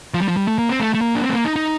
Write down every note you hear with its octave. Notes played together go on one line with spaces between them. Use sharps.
F3
G3
F3
G3
A3
A#3
C4
A3
A3
A#3
D4
C4
A3
A#3
D#4
D#4